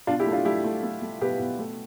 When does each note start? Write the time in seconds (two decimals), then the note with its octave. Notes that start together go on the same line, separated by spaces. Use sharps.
0.07 B2 D4 F4
0.19 E4 G4
0.26 A3
0.32 D4 F4
0.45 A3 E4 G4
0.64 A3
0.83 A3
1.02 A3
1.21 B2 G4 B4
1.39 B2
1.59 A3